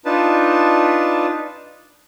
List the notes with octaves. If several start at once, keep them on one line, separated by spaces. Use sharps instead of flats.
D4 D#4 F4 B4 A5